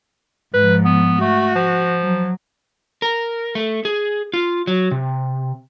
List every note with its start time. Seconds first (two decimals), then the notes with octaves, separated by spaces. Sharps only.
0.54 G#2 F3 B4
0.85 B3
1.21 A3 F#4
1.56 F3
2.02 F#3
3.02 A#4
3.55 A3
3.85 G#4
4.34 F4
4.67 F#3
4.91 C3